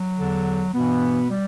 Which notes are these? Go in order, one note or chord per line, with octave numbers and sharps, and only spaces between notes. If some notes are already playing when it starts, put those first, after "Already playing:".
Already playing: F#3
E2 D3
G2 B2 E3 B3
G3